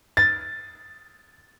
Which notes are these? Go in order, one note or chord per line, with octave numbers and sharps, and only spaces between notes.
A6